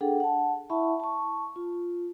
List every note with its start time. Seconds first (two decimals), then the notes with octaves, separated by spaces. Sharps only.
0.01 D4 G#4 A4 F#5 G5
0.20 F#5 A5
0.70 E4 E5 F#5 A5 B5 C#6
1.00 A5 C#6
1.56 F4